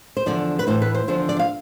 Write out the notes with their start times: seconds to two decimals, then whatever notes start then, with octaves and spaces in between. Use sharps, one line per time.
0.17 C5
0.26 E2 D3 F3 D5
0.59 B4
0.67 A2 E3 C5
0.82 B4
0.95 C5
1.08 E2 D3 F3 C5
1.29 D5
1.39 F5